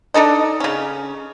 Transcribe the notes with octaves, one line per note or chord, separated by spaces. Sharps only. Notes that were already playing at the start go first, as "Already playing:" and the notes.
D4 D#4 A4 D#5
C#3 C#4